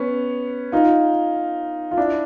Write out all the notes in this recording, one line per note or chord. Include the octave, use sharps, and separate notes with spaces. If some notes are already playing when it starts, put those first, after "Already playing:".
Already playing: B3 C#4
D#4 F4
F4
D4 E4